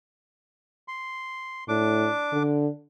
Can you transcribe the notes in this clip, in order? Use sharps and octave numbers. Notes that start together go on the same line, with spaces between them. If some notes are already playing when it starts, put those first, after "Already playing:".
C6
A2 D4 D6
D3